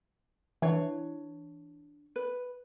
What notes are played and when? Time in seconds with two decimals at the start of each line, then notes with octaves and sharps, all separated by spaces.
0.62 E3 D4 C#5
2.16 B4